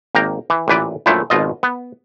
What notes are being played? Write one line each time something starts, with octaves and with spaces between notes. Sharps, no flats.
G#1 A#3 G5 A#5
E3
A1 A#2 E3 B4 D5
F#2 A#2 F3 A3 D4 E4
G#1 B2 F4 D#5
B3